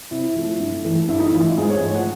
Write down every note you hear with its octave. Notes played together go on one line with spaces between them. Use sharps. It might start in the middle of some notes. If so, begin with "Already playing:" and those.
C3 E4
F3 A3
G2
E3 A3
G2 E4
D#4
E4
E3 A3 F4
G#2 G#4
C#5
F3 A3
F#5